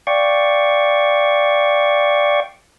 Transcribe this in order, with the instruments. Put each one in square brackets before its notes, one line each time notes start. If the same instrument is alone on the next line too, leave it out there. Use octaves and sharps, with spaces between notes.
[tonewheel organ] D5 F5 G5 C#6